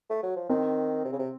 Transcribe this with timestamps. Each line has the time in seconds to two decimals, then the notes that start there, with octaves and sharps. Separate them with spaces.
0.10 A3
0.23 F#3
0.36 F3
0.49 D#3 C4
1.05 C3
1.12 C#3
1.19 C3